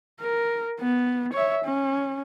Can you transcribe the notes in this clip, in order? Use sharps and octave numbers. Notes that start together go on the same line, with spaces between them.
A#4
B3
C#5 E5
C#4